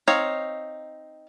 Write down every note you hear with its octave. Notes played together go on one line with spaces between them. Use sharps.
C4 D#4 C#5 F5